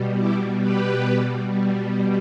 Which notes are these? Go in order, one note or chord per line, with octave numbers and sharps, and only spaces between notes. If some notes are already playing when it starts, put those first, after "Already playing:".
Already playing: B2 G3
E4 G4
G4 B4
B2 G3